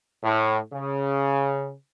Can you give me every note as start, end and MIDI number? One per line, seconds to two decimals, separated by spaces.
0.24 0.58 45
0.73 1.73 49